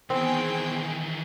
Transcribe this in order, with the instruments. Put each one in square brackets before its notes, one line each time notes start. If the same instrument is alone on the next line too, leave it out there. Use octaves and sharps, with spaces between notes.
[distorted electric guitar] D#3 E3 [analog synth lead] B3 [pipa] C4 [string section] G#4 G5